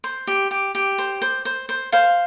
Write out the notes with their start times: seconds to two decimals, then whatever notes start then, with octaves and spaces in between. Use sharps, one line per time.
0.04 C5
0.27 G4
0.51 G4
0.75 G4
0.98 C5
1.22 C5
1.45 C5
1.69 C5
1.92 C5 F5